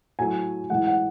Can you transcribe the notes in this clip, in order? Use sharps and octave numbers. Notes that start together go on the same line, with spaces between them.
A2 F#3 A3 G#5
A2 E3 G#3 F#5
F#5